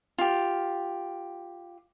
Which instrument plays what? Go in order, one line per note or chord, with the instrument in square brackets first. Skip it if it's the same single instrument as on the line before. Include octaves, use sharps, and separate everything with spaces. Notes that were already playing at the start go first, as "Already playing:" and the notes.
[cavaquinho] F4 G4